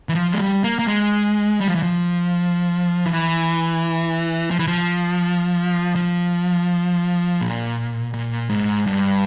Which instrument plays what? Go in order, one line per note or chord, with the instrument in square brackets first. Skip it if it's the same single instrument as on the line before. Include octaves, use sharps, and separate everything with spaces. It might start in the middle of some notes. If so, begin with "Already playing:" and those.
[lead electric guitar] E3
F3
G#3
G3
A#3
A#3
G#3
G3
F3
E3
F3
E3
F3
E3
F3
F3
A#2
A#2
G#2
G2